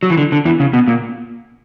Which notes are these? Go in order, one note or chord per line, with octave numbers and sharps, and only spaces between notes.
F#3
E3
D3
D3
E2 E3
C#3
B2
A#2